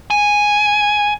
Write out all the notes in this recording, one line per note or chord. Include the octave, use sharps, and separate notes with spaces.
G#5